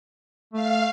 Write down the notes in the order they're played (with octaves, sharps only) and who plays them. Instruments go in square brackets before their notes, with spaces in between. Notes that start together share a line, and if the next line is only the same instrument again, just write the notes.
[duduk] A3 [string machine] F5